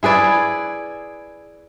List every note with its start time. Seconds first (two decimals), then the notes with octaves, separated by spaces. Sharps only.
0.03 E4 G#4 B4 D5